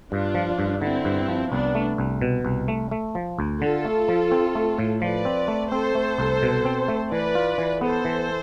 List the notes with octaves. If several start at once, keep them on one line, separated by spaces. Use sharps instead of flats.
G2 D4 F4
F3
G2
D3 C4 E4
G2
F3
C2 B3 D4
A3
C2
B2
C2
A3
A3
F3
D2
D3 F4 A4
A3
F3
C4
A3
A2
F3 B4 D5
C4
A3
C4 A4 C5
A3
C2
B2
C4
A3
E3 B4 D5
F4
E3
B3 A4 C5
E3